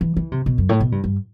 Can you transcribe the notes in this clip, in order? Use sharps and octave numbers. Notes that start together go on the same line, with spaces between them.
E3
E3
C3
B2
F#2
A2
B2
G2
G2